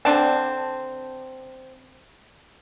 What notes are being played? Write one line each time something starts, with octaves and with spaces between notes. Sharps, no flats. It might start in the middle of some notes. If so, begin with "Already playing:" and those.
D3 C4 D4 A5